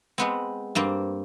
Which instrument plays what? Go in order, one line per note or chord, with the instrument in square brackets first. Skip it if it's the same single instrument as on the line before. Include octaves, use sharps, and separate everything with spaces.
[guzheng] G#3 B3 C4
G2 A#3 C4